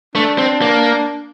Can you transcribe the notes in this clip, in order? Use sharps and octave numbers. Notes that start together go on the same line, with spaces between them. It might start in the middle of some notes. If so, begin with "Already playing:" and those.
A3 D4
C4
A#3